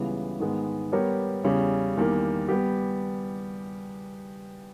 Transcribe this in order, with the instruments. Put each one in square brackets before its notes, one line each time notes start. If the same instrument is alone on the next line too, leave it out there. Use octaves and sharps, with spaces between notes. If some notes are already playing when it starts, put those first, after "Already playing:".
Already playing: [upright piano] C#2 C#3 E3 G3 B3
G#2 D#3 G#3 B3
G3 B3 G4 A#4 C#5
E2 C#3 G3 C#4
E2 D#3 G3 A#3
G3 B3 G4